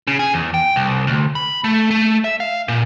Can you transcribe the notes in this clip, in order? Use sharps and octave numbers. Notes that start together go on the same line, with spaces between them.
C#3
G#4
E2
G5
C2
D2
B5
A3
A3
E5
F5
A#2